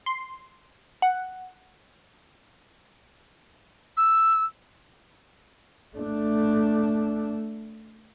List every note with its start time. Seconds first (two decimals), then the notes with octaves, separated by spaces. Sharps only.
0.06 C6
1.02 F#5
3.97 E6
5.97 A3 D4